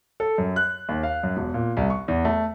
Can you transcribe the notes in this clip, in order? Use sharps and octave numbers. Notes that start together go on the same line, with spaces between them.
A4
F#2
F#6
D#2
F5
F#2
E1
A#2
C2
C#6
E2
A3